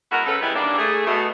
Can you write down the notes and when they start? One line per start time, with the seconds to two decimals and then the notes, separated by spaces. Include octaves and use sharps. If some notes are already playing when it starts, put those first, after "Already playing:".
0.12 G#3 B3 E4 F#4 A#4 F#5
0.26 C#3 A4 B4
0.41 E3 G3 G#3 B3 E4
0.55 D#3 E3 G3 A#3 D4
0.78 A3 G#4
1.06 B2 A3